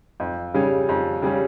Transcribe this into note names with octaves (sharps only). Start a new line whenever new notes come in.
F2
C#3 G3 C#4
F2
C#3 G3 C#4